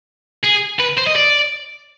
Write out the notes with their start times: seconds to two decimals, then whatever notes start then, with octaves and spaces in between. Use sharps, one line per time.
0.44 G#4
0.80 B4
0.98 C5
1.07 D#5
1.16 D5